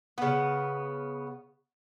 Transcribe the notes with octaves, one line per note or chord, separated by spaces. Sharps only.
C#3 B3